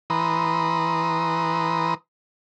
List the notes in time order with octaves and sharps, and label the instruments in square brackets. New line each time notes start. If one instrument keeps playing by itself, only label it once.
[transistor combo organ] E3 B4 A#5 C6 D#6